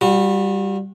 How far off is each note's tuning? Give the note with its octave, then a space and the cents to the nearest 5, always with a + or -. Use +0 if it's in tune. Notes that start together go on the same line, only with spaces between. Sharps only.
G3 +0 F#4 -40